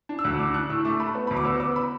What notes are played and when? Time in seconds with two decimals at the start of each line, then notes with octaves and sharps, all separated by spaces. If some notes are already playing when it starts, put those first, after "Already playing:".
0.09 D4
0.19 E6
0.24 D2 F#6
0.39 D4 D6
0.54 D4 F#6
0.69 A2 E6
0.85 A3 D6
1.00 A3 B5
1.15 B3
1.27 D2 B5
1.37 D6
1.45 B3 E6
1.60 B3 D6
1.76 B5